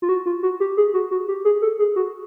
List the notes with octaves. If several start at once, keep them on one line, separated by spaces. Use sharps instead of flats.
F4
F#4
F4
F#4
G4
G#4
F#4
F#4
G4
G#4
A4
G#4
F#4